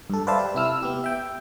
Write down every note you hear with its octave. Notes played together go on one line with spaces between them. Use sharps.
G2 A4
B4 C5 D5 E5 F5 A5
G4
C3 E4 E6 F6
B3 G4
E5 G5